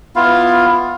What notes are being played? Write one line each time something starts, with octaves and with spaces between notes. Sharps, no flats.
B3 E4 F4 F5